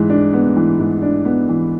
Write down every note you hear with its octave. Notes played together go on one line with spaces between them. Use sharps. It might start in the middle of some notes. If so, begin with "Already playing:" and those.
Already playing: G#2 E3
D4
B3
E3
G#2
D4
B3
E3